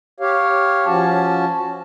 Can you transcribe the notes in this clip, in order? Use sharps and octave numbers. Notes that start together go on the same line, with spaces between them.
G4 C#5 F5
F3 C#4 F#4 A5